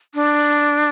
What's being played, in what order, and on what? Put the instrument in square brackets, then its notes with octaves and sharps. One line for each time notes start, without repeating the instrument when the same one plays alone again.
[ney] D4